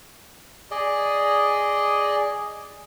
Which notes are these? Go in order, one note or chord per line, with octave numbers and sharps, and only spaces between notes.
G#4 D5 D#5